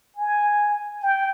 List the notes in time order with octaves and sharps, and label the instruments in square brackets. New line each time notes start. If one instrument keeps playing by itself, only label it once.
[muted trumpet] G#5
G5